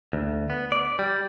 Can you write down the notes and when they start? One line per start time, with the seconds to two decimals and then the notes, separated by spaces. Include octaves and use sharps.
0.13 D2
0.50 B3
0.72 D5
0.99 G3